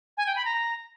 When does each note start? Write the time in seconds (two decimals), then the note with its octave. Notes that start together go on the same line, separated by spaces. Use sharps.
0.17 G#5
0.26 G5
0.36 B5
0.45 A#5